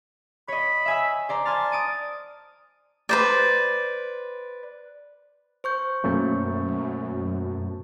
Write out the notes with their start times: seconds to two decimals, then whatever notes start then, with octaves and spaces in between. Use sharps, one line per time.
0.48 C#5 D#5 B5
0.85 E5 G#5 E6
1.29 C5 D5 A#5
1.45 G#5 A5 C6 F6
1.72 D#6 D7 D#7
3.09 B4 C5 D5
5.64 C5 C#6 G6
6.04 F#2 B2 F#3 A3 A#3 C#4 A4